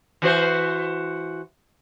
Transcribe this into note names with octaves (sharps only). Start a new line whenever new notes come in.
E3 F#4 C5